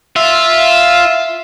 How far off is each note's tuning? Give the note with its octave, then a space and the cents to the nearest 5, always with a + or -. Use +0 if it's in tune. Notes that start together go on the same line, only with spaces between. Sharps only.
F4 +0 E5 +0